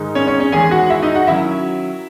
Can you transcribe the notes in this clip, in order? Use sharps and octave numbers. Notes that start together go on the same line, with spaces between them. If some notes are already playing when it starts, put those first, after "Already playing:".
Already playing: G#2 D#3 G#3 D#4
C#4 C#5
C#4 C#5
C#4 C#5
E2 D#3 G#3 G#4 G#5
F#4 F#5
E4 E5
D#4 D#5
F#4 F#5
D#3 F#3 C#4 E4 E5